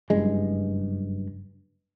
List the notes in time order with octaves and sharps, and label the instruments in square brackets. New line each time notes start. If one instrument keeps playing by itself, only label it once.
[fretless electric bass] F#1 G2 G#3